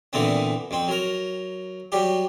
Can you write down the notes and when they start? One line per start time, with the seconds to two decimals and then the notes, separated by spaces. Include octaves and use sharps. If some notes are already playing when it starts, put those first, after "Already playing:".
0.13 A#2 D3 E3 B3 C4
0.71 F2 C4
0.88 F#3 A#4
1.92 F#3 G3 G4